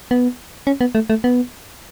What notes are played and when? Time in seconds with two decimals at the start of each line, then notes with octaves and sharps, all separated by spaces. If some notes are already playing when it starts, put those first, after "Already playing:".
0.11 B3
0.67 C#4
0.81 B3
0.95 A3
1.10 A3
1.24 B3